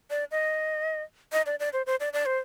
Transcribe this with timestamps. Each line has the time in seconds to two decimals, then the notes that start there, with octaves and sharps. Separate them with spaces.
0.10 D5
0.31 D#5
1.32 D#5
1.46 D5
1.60 D5
1.73 C5
1.86 C5
2.00 D5
2.13 D5
2.26 C5